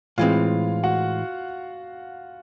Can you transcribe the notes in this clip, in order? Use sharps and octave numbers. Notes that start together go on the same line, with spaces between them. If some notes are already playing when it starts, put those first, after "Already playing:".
A2 E3 G#3 C4 F4 F5
F#4 F#5